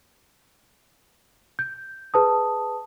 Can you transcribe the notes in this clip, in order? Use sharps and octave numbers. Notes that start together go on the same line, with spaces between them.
G6
G#4 B4 A5 D#6